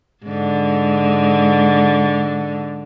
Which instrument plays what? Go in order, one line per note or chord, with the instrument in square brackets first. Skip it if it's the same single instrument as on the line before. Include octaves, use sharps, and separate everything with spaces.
[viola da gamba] G#2 D3